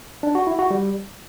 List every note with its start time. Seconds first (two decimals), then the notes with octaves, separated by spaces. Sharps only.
0.23 D4
0.35 F#4
0.47 E4
0.59 F#4
0.71 G3